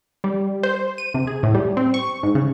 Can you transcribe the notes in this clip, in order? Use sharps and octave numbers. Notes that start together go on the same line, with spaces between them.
G3
C5
D#7
C3
G#4
A2
G3
C4
C#6
G#2
C#3